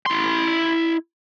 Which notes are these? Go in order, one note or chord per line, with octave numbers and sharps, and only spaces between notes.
E4 C6